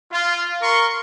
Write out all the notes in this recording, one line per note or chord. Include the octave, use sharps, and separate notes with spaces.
F4
A#4 C6 C#6